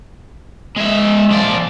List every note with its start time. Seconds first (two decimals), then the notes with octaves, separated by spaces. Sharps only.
0.76 G#3 E5
1.31 F3 D5